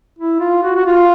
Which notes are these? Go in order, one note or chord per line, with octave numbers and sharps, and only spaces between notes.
E4
F4
F#4
F#4
F4